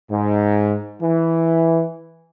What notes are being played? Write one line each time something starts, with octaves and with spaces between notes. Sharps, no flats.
G#2
E3